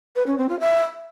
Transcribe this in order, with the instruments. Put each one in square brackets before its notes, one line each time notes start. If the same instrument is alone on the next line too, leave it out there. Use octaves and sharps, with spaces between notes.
[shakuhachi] B4
C#4
C4
F4
E5